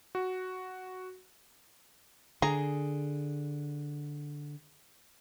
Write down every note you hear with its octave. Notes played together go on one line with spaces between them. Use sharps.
F#4
D3 G#4 A#5